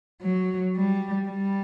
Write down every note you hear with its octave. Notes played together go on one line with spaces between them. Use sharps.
F#3
G3
G3